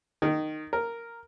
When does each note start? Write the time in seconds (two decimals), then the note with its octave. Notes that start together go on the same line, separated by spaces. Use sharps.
0.22 D#3
0.73 A#4